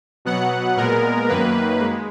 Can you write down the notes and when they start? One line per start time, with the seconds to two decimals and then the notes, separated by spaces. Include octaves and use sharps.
0.25 B2 F#3 B3 F#5
0.77 A#2 G#3 B3 A#4
1.29 F#2 D#3 A#3 B4
1.80 G#3